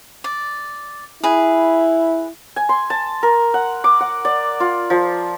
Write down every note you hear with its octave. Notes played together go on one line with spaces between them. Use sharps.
D5
E4 G#4 B4
G#5
C6
A5
A#4
F#5
D6
F#5
D5
F4
F3